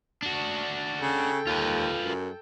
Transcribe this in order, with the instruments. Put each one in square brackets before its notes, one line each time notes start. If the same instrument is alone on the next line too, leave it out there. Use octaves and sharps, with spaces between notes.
[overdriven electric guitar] D4 F#4
[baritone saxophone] C#3 [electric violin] A4 G5
[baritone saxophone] D#2 [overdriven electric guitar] F4 B4
[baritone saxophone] F#2